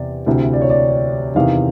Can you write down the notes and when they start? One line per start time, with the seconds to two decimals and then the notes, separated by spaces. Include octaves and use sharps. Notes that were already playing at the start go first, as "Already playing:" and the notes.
Already playing: E2 C3 D5
0.26 D2 C3 E3
0.53 D5
0.61 C#5
0.70 D5
1.35 E2 C3 D#3 F5